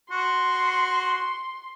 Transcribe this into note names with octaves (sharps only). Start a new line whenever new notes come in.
F#4 C6